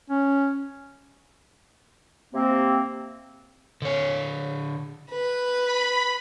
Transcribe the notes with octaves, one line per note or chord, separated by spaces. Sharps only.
C#4
C3 A#3 C4
D3 C#5
B4
B5